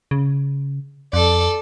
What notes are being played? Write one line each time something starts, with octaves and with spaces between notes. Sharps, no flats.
C#3
F2 A4 D5